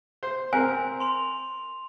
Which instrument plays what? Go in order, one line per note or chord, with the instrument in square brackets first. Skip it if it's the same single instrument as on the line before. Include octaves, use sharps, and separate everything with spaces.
[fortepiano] C5
[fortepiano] C4 A#4 [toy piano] C5 G#5
[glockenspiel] C6 F7